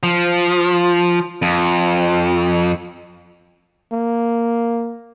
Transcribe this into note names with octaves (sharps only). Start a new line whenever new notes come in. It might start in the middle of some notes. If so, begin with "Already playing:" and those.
F3
F2
A#3